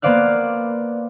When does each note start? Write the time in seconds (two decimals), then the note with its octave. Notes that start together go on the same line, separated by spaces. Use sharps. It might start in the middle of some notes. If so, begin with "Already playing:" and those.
0.02 A#3 B3 C5 D5 F5 F#6